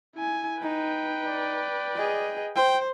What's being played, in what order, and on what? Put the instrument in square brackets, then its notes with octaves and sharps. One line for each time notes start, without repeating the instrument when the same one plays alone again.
[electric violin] E4 G#5
[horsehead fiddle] D#4 [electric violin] B4 G5
[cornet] D5
[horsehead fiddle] G#4 D#5
[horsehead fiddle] C5 [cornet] G5